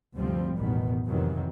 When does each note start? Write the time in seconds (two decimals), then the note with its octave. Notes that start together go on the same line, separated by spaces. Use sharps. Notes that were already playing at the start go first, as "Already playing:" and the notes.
0.15 D2 G2 C3 F3 G3 C4
0.57 A1 E2 B2 D#3 B3
1.06 F2 C3 D#3 E3 F#3